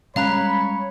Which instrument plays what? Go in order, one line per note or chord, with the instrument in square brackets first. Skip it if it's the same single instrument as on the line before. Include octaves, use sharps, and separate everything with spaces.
[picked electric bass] G3 G#3 C#4 [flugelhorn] C#5 [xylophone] F5 A#5 F#6 [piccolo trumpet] B5